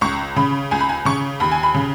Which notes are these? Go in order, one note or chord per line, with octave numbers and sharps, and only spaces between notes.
C#2 C#6
C#3 B5
C#2 G#5
B5
G#5
C#3 C#6
D#2 B5
G#5
B5
C#3